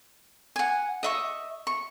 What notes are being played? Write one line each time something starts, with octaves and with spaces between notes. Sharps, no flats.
F#5 G#5
D#5 E5 C#6
C#6